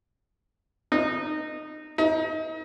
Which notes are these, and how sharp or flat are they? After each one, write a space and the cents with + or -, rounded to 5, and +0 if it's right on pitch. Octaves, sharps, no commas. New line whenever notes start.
D#4 -20
D#4 +30